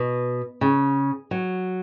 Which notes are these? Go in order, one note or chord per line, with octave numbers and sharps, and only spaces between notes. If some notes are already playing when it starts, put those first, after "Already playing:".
Already playing: B2
C#3
F#3